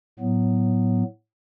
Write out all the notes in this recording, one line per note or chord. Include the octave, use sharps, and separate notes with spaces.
A2 F#3 B3